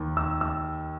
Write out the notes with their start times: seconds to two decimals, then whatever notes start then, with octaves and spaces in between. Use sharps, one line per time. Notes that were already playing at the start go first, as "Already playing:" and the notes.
Already playing: D#2
0.17 E6
0.41 E6